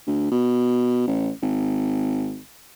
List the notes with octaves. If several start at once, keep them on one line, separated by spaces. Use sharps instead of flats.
D2
B2
A1
G#1